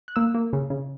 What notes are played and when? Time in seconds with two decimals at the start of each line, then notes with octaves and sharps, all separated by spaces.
0.08 F#6
0.16 A#3 E6
0.34 A#3
0.53 C#3
0.70 C#3